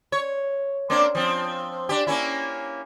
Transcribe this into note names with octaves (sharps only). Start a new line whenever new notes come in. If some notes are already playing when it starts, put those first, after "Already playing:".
C#5
A#3 C4 D4
F3 C4
D4 G4
A#3 C#4 E4